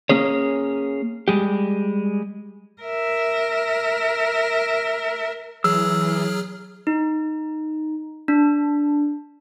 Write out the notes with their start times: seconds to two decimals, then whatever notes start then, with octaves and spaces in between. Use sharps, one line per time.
0.09 A#3 C#4 G#4 C#5
1.28 G3 G#3 G4
2.82 A#4 E5
5.64 E3 F#3 G#4 E6 F6
6.87 D#4
8.28 D4